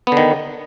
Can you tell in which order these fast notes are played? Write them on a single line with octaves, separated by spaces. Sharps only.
B3 D3 D#3